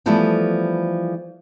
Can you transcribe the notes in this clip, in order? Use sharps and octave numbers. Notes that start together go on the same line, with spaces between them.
E3 F3 G3 A3 B3 A4